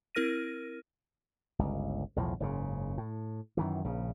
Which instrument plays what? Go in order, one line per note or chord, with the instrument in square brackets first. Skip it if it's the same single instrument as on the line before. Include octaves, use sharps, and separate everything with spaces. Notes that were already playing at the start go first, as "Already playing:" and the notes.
[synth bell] C4 E4 A#4 F6 A#6 D#7
[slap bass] G1 C#2
B1 E2 A2 F3
F#1 G#2 C#3
A2
F#2 D#3 E3
A#1 C#3